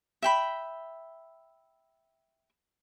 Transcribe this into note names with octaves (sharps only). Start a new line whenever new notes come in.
E5 G5 B5